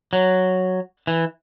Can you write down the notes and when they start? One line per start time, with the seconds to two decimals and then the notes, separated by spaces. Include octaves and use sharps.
0.13 F#3
1.07 E3